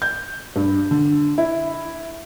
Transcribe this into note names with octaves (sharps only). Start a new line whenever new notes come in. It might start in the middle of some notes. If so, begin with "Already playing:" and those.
G6
G2
D3
E4